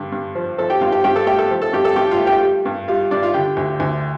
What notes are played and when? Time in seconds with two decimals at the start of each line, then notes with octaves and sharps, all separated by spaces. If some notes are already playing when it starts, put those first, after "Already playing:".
Already playing: G2 D3
0.12 G2
0.35 F3
0.58 F3 A4 A5
0.70 G4 G5
0.81 G2 F4 F5
0.92 G4 G5
1.04 G2 G4 G5
1.16 A4 A5
1.27 A3 G4 G5
1.39 A4 A5
1.50 F3
1.62 A4 A5
1.73 G2 G4 G5
1.85 A4 A5
1.96 G2 G4 G5
2.11 F4 F5
2.19 A3
2.27 G4 G5
2.43 G3
2.65 G2
2.88 G3 F4 F5
3.11 G2 D4 D5
3.22 F4 F5
3.34 D3 G4 G5
3.57 D2
3.80 D2